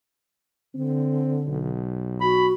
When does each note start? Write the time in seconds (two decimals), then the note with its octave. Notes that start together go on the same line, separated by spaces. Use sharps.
0.74 D3 C4
1.47 B1
2.21 F#4 B5